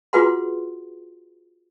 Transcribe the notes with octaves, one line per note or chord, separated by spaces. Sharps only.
F4 F#4 G#4 B4 F#5 C6